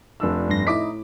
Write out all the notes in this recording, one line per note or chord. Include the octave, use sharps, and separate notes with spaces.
F1 D4 E6
G2 C6 A#6
A2 D#4 E4 D#5 D6 B6